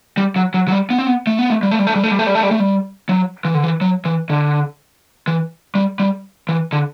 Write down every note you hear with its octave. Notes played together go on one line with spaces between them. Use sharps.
G3
F#3
F#3
F#3
G3
B3
C4
B3
A3
B3
A3
G3
A3
G3
A3
G3
A3
G3
A3
G3
A3
G3
A3
G3
F#3
E3
D3
E3
F#3
E3
D3
E3
G3
G3
E3
D3